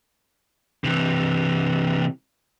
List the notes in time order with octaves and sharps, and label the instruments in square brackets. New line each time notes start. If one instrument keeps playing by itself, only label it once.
[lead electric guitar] C3 E3